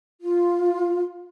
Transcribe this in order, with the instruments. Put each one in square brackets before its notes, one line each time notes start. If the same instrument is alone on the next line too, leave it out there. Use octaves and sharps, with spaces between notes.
[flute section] F4